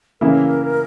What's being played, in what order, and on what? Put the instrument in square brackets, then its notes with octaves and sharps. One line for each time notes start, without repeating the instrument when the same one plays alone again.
[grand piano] C#3 E3 A#3 E4 [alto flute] A#4